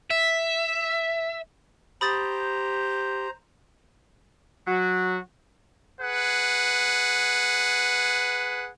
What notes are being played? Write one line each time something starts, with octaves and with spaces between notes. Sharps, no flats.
E5
G4 C5 A#5 B5 D#6 A6
F#3 F#4
G#4 B4 F#5